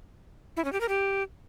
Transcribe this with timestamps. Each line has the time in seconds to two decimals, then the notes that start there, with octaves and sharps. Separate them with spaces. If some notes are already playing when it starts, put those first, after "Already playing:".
0.57 E4
0.65 C#4
0.73 G4
0.81 A#4
0.89 G4